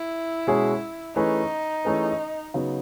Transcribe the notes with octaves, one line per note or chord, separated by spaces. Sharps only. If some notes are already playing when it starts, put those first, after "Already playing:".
Already playing: E4
B2 G#3 C#4 G#4
E3 A3 C#4 D#4 G#4 B4
E3 A3 C#4 G#4 B4
C#3 F#3 B3 D#4